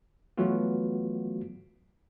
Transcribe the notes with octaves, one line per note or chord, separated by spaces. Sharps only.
E3 F#3 A3 B3 F4 F#4